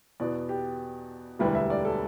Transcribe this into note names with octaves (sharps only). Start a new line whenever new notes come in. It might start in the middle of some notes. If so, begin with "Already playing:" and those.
E2 B2 B3 D5
G4
E1 D2 D3 G3 E4 B4
E5
D5
A4